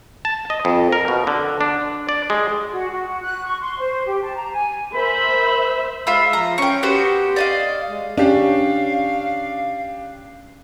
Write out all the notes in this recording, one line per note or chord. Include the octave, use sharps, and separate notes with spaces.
A5
D#5
F2
A#4
B2
D3
D4
D5
G#3
F#4
F#4
F#6
C#6
C6
C5
G4
A5
A#5
G#5
A#4 C5 E5 B5
G#3 F4 E5 B5
F3 A#5
C#4 G5 C#6
B3 F#4 G4 C5
D5 D#5 F5
G#3
C#4 D4 G4 F5